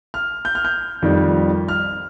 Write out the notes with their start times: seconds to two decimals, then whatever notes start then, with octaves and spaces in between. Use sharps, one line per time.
0.14 F6
0.45 G6
0.55 F6
0.65 G6
1.02 F2 D#3 G3
1.68 F6